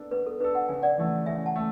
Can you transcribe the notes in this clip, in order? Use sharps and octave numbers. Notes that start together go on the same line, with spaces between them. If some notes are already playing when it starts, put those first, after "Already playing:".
Already playing: B3 D4 A4
B3 B4
A4
D4 A4 B4
F#5
C#3 G#5
D5 F#5
E3 A3
C#3 E5 G#5
F#5 A5
A3